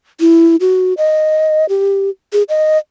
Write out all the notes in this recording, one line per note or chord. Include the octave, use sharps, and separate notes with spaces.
E4
F#4
D#5
G4
G#4
D#5